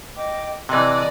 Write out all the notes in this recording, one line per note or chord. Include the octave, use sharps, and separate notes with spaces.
D#5 G5 D6
C3 E3 D5 D#5 G5 A5 F#6